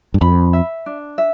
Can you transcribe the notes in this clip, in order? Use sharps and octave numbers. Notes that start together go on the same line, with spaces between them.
G2
F2 B5
E5
D4
E5